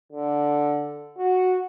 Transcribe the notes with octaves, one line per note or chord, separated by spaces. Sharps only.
D3
F#4